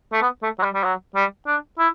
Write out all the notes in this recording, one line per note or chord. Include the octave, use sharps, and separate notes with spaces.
A3
B3
A3
F#3
G3
G3
F#3
G3
D4
E4